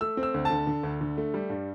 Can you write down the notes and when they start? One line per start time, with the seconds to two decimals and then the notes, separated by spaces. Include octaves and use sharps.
0.01 A3 E6
0.17 C4
0.23 E6
0.34 D2
0.45 D3 A5
0.67 D3
0.83 D2
1.01 D3
1.18 A3
1.34 G3
1.50 G2